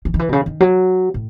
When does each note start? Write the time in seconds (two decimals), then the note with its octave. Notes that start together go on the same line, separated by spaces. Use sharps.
0.05 E3
0.14 D#3
0.19 E3
0.29 B2
0.33 C#3
0.46 D#3
0.60 F#3
1.14 A2